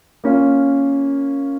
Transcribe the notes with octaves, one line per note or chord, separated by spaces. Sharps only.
A#3 C#4 F4